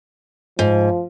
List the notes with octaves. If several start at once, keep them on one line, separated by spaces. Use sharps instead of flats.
G#2 F3